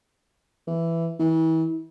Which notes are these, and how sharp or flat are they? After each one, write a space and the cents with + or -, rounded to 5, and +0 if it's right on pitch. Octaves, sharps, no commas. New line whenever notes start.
E3 +10
E3 -35